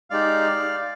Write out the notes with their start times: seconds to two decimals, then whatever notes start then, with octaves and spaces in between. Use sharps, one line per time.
0.10 G#3 D#4 G4 D5 F5